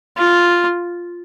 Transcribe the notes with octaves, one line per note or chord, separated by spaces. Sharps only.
F4